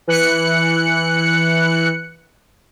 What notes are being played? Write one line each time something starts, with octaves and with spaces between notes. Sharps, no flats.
E3 F#6 C#7